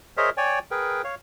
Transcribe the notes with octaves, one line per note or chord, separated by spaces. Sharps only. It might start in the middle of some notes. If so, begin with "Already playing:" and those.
G#4 A#4 C5 C#5 D#5 E5
C#5 D5 G5 G#5
G#4 A#4 B4 G5
C#5 F5